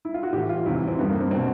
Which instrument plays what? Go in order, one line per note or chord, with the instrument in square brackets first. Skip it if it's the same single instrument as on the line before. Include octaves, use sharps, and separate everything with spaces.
[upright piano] E4
F4
F#4
A2 G4
E3
F4
E2 C3 E3 E4
E4
C4
G2 D3 B3
A#3
C4
B2 C4